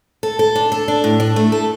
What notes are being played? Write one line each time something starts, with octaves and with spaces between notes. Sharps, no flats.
A4
A4
D4
A4
D4
A2
D4
A3
A4